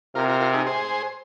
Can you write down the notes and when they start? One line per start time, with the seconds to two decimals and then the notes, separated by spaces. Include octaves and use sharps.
0.15 C3 F4 A#4
0.28 F4 A#4
0.41 F4 A#4
0.53 D#4 G#4
0.67 G#4 C5